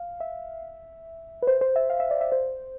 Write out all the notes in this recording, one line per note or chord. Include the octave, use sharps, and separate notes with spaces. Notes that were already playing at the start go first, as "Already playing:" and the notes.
Already playing: F5
E5
B4
C5
C5
E5
F5
E5
D5
E5
C5